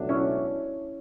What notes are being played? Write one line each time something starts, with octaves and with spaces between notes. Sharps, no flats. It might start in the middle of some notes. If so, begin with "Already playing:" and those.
Already playing: C#2 B2 F#3 A3 D4
C#4 E4